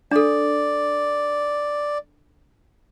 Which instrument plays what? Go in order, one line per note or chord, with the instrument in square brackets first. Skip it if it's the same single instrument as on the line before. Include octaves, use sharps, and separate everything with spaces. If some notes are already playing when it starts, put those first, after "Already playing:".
[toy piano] D4 A4 [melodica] D5